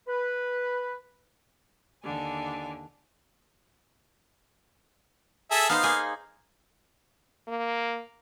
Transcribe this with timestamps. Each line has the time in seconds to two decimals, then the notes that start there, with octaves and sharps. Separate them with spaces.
0.08 B4
2.03 D#2 D3 D4 G#5
5.51 G#4 A4 E5
5.69 B3 D#4 C5 F5
5.83 A#3 G#4
7.48 A#3